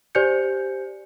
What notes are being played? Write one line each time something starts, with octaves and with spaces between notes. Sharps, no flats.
G4 C5 D5 G#5 G6 C#7